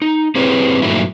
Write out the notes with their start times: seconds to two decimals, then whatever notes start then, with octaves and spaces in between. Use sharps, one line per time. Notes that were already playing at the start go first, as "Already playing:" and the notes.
0.02 D#4
0.35 C4 E4 G4 G#4 B4 C#5
0.82 G2 A#2 D#3 F#3 A3 E4